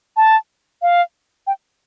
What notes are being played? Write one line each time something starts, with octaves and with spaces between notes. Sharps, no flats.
A5
F5
G5